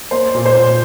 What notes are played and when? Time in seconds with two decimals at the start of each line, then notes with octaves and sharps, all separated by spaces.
0.11 A#3 C5
0.35 A#2
0.45 C5
0.56 A#2